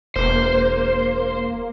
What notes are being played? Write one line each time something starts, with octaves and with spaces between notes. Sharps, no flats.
E1 A#3 C5